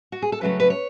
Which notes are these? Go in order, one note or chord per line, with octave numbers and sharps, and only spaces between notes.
F#4
G#4
A4
C#3 F#3 A3 C#4 B4
B4
C#5